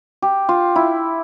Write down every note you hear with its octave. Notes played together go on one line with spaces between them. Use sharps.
G4
F4
E4